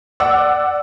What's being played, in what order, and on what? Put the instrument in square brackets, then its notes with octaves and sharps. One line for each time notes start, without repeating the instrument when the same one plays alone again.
[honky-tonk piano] D5 F#5 D6 E6